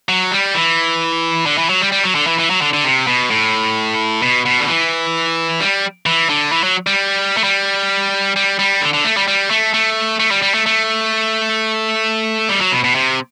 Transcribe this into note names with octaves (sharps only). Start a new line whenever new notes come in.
F#3
G3
E3
D3
E3
F#3
G3
G3
F#3
D3
E3
E3
F#3
D3
D3
C3
B2
A2
B2
B2
D3
E3
G3
E3
D3
E3
F#3
G3
A3
G3
G3
G3
D3
D3
A3
G3
G3
A3
A3
A3
G3
G3
A3
A3
G3
F#3
B2
B2
C3